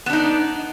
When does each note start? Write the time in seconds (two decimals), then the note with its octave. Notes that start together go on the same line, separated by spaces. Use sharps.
0.06 B3
0.10 D4
0.13 D#4